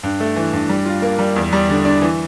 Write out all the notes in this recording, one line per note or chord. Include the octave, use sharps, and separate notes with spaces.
G2
A3
E3
G2
G3
F4
A#3
G3
E2
G3
D3
D4
E3